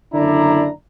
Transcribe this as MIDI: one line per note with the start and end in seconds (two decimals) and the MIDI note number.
0.14 0.69 30
0.14 0.69 50
0.14 0.69 62
0.14 0.69 64
0.14 0.69 74
0.14 0.69 82